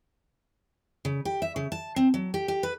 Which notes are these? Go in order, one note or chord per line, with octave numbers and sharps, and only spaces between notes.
C#3
G4
E5
C#3
A5
C4
F#3
G4
G4
B4